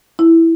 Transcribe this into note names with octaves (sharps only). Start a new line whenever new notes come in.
E4